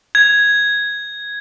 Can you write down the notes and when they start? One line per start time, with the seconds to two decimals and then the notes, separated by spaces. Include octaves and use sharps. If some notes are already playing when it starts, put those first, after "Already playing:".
0.15 G#6